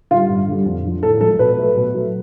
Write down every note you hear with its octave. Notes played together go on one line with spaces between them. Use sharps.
D3 G3 F4
G2
D3 G3
F2
D3 F3
A2 A4
F3 G#3 A4
B2 B4
F#3 A3
B2
F#3 A3